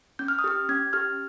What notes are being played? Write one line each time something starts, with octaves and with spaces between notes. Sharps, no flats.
C#4 G6
F6
D#6
G4 F6
C#4 G#6
G4 F6